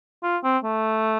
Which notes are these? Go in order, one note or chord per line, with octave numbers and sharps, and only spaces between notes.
F4
C4
A3